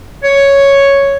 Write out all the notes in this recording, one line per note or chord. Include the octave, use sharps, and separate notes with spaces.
C#5